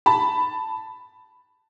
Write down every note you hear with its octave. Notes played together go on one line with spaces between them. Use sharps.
A5 B5